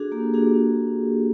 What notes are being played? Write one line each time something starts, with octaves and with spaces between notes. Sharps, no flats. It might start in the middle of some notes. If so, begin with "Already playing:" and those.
Already playing: D4 F#4 G#4 A4
A#3 G4
D4 F#4 G#4